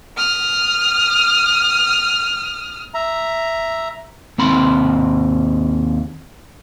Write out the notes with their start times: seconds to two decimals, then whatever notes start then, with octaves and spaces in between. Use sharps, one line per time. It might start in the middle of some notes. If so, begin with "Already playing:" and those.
0.17 D#6 F6
2.94 E5 A#5
4.38 D#2 C4 B5 C6